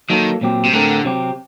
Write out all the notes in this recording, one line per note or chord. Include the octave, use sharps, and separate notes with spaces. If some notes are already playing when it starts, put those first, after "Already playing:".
D#3 F#3 A#3 D#4 A4
A#2 F#3 C4 G4
C3
A2 D3 A3 C4 G4 A#4
C3 F#3 C4 G4